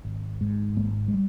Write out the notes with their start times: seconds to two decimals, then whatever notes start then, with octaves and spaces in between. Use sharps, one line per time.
0.05 G#1
0.41 G#2
0.77 G#1 G#3 A#3
1.08 G#3
1.14 G3